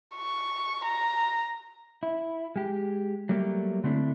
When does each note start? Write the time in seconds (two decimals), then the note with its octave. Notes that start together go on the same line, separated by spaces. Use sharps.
0.16 C#6
0.85 A#5
2.03 E4
2.56 G#3 G4
3.29 F#3 G3 A3 A#3 G4
3.84 D3 A3 C4 D4 E4 A4